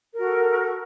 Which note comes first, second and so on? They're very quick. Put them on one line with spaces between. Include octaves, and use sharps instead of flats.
A#4 F#4 A4